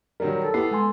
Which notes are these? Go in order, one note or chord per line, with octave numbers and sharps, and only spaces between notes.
D#3 F#3 G3 A#4
A4
B3 E4 G4 C7
G#3 G#5 C6